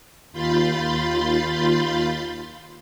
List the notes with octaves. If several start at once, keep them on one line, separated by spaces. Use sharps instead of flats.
D#2 F4 B5 C6 G6 A6